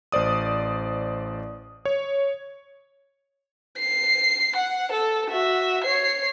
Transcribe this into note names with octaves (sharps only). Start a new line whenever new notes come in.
A1 C5 D5 D#6
C#5
C7
F#5
A4
F#4 E5
C#5 C7